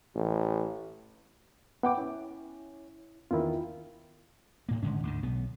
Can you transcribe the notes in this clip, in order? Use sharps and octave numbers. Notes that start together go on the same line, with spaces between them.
A1
B3 F#5 G5 D6
C#4 E4
E2 D#3 E4 F4
D2 A2 A#3
G#1 D3 G#3 C#4
D2 G#2 D3
B1 B3